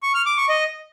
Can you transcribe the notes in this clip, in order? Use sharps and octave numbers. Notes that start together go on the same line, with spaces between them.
C#6
F6
D6
C#6
D#5